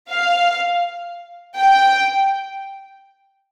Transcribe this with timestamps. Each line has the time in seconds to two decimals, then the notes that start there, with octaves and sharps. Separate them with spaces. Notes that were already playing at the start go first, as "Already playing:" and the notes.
0.11 F5
1.56 G5